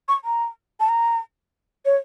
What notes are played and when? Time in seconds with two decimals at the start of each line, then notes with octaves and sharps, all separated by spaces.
0.08 C#6
0.25 A#5
0.80 A5
0.89 A#5
1.85 C#5